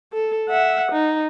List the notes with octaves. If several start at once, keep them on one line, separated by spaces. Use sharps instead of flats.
A4
E5 F#5
D#4